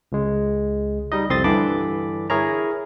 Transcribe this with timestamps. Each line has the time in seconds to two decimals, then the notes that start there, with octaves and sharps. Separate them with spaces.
0.12 C#2 G#3
1.12 G3 D#4 D#5
1.29 C2 F2 C4 C6 D#6 A6
1.44 G2 D3 E3 A5 B5 D6
2.30 E4 G#4 A#4 C#5 A#5